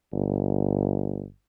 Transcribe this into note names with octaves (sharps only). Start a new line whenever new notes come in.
G1